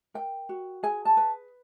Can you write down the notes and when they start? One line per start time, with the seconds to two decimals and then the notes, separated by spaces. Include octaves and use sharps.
0.14 A#4 G5
0.49 F#4
0.83 G#4 G#5
1.05 A5
1.17 B4